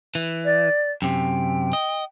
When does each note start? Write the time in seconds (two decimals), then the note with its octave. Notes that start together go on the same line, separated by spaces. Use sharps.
0.15 E3
0.45 D5
1.02 F#2 C3 G5
1.73 D#5